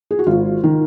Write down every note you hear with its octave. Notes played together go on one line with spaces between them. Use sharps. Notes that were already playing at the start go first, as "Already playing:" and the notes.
G#4
F#4
G#1 F4
D#3